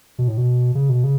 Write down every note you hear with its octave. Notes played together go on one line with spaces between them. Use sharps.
B2
A2
B2
C#3
B2
C#3